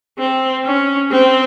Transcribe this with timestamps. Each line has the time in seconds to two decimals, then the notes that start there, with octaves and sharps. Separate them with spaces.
0.19 C4
0.65 C#4
1.11 C4